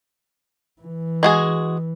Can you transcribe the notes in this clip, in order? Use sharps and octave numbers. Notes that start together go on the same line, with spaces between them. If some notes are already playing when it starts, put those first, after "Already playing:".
E3
G#3 F#4 G#4